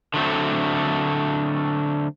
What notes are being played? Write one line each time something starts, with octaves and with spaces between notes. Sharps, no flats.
D3 F#3 A3 C4